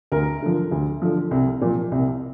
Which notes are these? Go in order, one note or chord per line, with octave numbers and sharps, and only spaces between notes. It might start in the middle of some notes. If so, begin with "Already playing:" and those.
D2 A#4
D3 F3
D2
D3 F3
C2
A#2 F3
C2